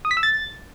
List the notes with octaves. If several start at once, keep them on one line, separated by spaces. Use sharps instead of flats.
D#6
B6
E6
A6